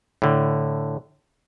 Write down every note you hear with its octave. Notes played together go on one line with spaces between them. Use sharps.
A2 D3